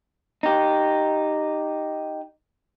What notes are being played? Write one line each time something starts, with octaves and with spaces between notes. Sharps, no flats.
D#4 G4